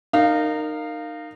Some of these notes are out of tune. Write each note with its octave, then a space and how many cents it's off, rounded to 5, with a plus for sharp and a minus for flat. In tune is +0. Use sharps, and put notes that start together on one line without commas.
D#4 -25 A#4 -15 F5 +0